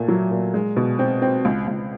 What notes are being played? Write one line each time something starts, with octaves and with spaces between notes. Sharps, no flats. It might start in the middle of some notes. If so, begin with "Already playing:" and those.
Already playing: A#2 A3
F#3
A#2
G#3
B2
C4
C4
C#2
C#2